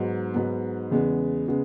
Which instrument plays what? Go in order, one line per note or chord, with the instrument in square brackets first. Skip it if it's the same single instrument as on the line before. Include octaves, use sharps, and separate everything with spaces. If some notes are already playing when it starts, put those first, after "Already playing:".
Already playing: [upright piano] G#2 F#3 B3
G#2 F#3 B3
E2 C#3 G#3 B3
C#3 G#3 B3